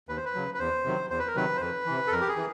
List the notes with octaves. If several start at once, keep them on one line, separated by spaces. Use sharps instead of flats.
D#2 B4
C5
B4
C#3 F#3
B4
E2 C5
C3 D#3 F#3
E2 C5
B4
A#4
C3 D#3 F#3 B4
C5
F2 B4
C3 E3
A4
F2 A#4
G4
G#4
E3